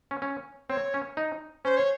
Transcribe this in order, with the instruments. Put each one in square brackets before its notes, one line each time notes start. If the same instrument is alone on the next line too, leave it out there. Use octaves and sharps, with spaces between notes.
[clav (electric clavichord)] C#4
C#4
[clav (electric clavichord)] C4 [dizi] C#5
[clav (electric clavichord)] C#4
D#4
[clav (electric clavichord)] C#4 [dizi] C5
[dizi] C#5